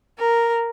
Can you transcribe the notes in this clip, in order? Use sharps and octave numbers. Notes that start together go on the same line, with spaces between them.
A#4